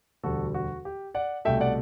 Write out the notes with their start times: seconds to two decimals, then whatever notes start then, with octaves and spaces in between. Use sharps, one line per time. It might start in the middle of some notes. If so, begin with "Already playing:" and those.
0.23 E1 D2 D3 G3 F#4 A4
0.54 F#4
0.85 G4
1.15 D5 F#5
1.45 C2 B2 A3 E5 G5
1.61 D5 F#5